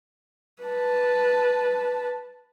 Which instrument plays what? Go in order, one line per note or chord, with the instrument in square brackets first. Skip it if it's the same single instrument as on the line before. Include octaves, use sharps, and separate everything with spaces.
[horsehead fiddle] B4 A5